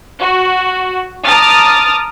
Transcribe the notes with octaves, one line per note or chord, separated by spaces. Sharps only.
F#4
A5 A#5 D6 D#6 F6 A6